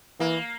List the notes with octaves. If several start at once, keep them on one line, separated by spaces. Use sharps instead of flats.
E3 A#3